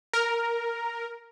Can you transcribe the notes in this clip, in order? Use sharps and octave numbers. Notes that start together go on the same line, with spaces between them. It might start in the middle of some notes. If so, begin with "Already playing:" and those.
A#4